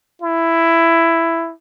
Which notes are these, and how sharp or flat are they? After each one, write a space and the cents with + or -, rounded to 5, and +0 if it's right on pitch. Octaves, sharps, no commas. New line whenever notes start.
E4 +10